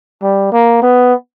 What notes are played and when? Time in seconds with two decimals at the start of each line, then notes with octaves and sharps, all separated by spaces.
0.23 G3
0.53 A#3
0.82 B3